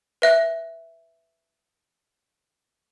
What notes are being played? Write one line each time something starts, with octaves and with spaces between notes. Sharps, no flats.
B4 E5 F#6